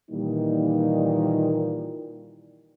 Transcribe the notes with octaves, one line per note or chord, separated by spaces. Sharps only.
A#2 D#3 E3 G3 A#3 D#4